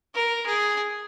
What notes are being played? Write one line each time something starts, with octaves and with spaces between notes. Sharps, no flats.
A#4
G#4